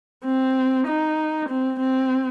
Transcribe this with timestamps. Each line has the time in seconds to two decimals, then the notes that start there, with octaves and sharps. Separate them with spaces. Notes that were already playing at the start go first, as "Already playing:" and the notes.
0.25 C4
0.87 D#4
1.49 C4
1.80 C4